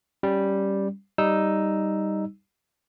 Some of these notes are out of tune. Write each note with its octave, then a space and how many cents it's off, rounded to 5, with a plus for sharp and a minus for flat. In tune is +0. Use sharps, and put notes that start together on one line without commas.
G3 +0 C#4 +0
G3 +0 D#4 +0 E6 +0